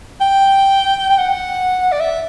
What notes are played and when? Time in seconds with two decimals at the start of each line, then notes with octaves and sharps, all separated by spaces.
0.21 G5
1.09 G5
1.18 F#5
1.92 D5
2.00 E5